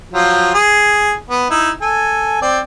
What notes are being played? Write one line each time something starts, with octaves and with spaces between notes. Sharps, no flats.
F3 F#3 F4
G#4
B3
D#4 E4
A4 G#5
C4 D5